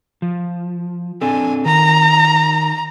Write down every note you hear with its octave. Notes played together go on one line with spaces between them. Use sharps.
F3
C4 D4 A4 G#5
D#3 A#5